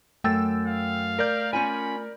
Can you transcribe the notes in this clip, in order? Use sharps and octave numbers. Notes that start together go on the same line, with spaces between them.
F#2 A3 G5 E6 A6
F5
A#4 D5 G6
C#4 F4 G#5 B5